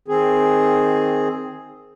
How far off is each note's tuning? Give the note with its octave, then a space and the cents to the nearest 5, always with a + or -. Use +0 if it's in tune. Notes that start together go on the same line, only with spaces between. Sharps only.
D#3 +5 C4 +0 G#4 +0